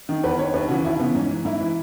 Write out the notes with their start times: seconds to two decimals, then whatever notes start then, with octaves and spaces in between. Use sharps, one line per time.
0.09 D#3
0.23 E2 B4
0.39 D#3 C#5
0.54 D#2 B4
0.69 C#3 E3 F#4
0.85 D#2 E4
0.99 C#3 E3 B3
1.15 G#2 C#4
1.29 E3
1.45 G#2 E4
1.61 E3